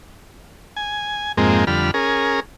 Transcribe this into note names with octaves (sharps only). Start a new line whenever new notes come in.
G#5
F2 G#2 G#3 A#3 C4
F2 D3 G3 B5 F6
C#4 G#4 A#4